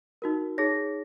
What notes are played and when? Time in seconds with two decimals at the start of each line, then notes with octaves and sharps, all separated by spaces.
0.22 D#4 F#4 A#4
0.58 D#4 G#4 C#5 A#6